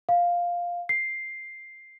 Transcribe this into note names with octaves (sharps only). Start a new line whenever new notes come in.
F5
C7